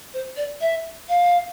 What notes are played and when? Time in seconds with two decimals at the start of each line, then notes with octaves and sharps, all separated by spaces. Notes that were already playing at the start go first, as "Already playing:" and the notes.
0.14 C5
0.37 D5
0.61 E5
1.09 F5